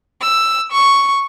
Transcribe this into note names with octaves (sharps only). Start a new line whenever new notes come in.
E6
C#6